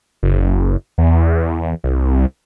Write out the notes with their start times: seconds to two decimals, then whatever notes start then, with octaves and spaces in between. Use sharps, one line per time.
0.23 F#1
0.98 E2
1.84 C2